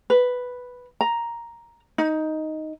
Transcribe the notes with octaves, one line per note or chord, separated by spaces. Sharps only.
B4
A#5
D#4